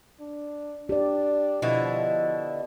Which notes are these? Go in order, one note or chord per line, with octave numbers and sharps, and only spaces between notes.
D4
D4 G4 D5
B2 D3 F3 E4